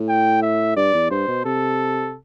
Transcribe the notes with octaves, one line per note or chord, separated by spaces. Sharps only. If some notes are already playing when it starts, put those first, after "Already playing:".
Already playing: A2
G5
E5
G2 D5
E2
G2 C5
B2
C3 A4